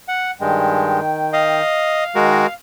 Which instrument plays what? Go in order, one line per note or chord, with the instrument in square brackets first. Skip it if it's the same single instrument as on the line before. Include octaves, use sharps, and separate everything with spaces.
[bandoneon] F#5
[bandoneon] G2 G#3 [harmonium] D#3 G5
[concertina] D#5 [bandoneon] F5
[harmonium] D#3 [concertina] G#3 F#4 A#4